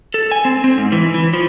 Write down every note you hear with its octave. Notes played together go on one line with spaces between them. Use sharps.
A4
G#5
C4
C4
G#2
E3
E3
F3